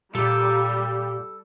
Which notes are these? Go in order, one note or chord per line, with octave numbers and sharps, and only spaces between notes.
A#2 G3 G4 A4